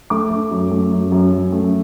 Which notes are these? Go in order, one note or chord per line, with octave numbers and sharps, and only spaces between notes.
A3 D6
A3
F#2
A3
F#2
F#2
F#2
A3